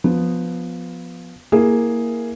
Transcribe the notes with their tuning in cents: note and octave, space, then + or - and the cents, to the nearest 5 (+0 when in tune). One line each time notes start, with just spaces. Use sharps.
F3 +10 B3 +0
A#3 +0 E4 +0 G#4 +0